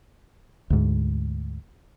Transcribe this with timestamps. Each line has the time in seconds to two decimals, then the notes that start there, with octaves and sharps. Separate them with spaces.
0.70 D2 G#2